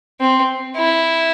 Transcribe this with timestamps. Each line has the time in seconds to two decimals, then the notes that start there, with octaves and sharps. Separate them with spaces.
0.20 C4
0.76 E4